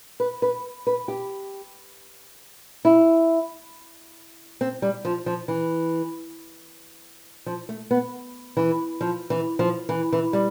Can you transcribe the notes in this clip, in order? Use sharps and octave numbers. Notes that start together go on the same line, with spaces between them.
B4
B4
B4
G4
E4
C4
G3
F3
F3
E3
F3
A3
B3
E3
F3
E3
F3
E3
E3
G3